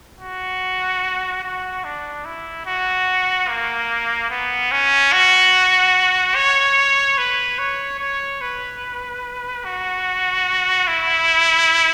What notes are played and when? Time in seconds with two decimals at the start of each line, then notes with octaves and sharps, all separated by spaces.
0.20 F#4
1.43 F#4
1.84 D4
2.25 E4
2.66 F#4
3.49 A#3
4.31 B3
4.72 C#4
5.13 F#4
6.36 C#5
7.18 B4
7.59 C#5
8.00 C#5
8.41 B4
9.65 F#4
10.87 E4